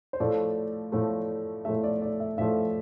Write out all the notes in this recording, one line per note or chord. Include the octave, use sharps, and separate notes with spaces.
C5
A2 F3 A3 D5
A2 F3 A3
A2 F3 A3 E5
D5
D5
E5
A2 F3 A3 E5